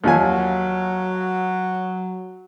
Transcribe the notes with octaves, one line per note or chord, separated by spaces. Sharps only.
D#2 F3 F#3 G#5